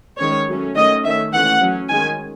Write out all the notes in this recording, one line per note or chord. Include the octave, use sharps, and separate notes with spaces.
D#3 G#3 C#4 C#5
F#3 A3 C#4
D#3 A3 C#4 D#5
D#3 A3 C#4 E5
E3 A3 C#4 F#5
F#3 C#4
D#3 G#3 C#4 G#5